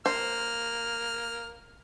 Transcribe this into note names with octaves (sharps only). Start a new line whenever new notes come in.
A#3 C5 F6